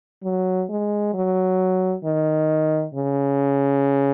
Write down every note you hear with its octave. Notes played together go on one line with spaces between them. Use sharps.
F#3
G#3
F#3
D#3
C#3